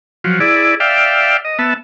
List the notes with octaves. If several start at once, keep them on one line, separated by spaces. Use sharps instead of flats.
F3 F#3
E4 G#4 D5
D5 E5 F5 G5
D#5
B3 E5 A5